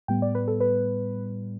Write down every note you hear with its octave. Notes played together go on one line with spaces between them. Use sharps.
A2 G3 B3 G5
D5
B4
A4
B4